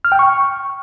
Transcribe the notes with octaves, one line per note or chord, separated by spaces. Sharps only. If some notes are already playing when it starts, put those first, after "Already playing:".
F6
G5
C#6